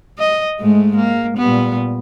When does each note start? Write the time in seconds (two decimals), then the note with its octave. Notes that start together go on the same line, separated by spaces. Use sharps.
0.19 D#5
0.60 G#2 G#3 A3
0.96 A#3
1.37 A#2 G3 B3